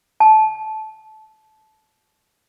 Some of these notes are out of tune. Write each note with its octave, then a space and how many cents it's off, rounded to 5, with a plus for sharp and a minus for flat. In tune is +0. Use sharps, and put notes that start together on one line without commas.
A5 -20